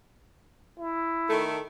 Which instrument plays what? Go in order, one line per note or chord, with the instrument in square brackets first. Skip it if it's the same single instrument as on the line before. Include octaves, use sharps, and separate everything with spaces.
[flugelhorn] E4
[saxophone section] D#3 A3